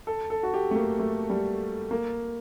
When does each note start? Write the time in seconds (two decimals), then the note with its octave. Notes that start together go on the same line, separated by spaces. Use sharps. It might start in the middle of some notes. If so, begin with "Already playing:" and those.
0.07 A4
0.30 A4
0.43 F#4
0.54 G4
0.71 A3
0.76 A#3
0.99 A3
1.30 G3
1.91 A#3